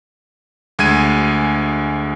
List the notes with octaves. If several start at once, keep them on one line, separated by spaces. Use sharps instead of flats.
D2 G#3 G#6 D#7